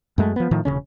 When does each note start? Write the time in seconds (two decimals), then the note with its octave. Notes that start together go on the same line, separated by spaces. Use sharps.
0.18 F#2 G#3 A3
0.36 F3 B3
0.51 A2 D#3 F3
0.65 E1 D#2 C#3 C#4